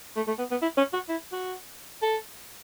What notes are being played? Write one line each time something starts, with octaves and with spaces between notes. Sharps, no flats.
A3
A3
B3
B3
E4
C#4
F#4
E4
F#4
A4